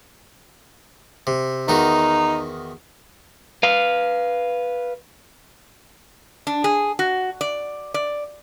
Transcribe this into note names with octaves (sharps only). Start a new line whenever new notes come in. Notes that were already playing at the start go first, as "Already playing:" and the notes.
C3
E2 D#3 D#4 F#4
B4 F5
D4
G#4
F#4
D5
D5